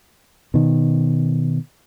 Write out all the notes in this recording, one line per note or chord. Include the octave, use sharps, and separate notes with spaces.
B2 D#3